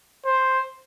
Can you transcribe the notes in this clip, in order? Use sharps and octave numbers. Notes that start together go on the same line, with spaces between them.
C5